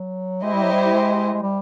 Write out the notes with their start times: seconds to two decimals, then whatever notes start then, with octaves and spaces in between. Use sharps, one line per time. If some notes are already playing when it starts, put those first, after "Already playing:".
Already playing: F#3
0.43 G#3 E4 G4 C5 D#5
0.53 G3
0.63 F#3
0.73 G3
0.93 G#3
1.34 G#3
1.43 G3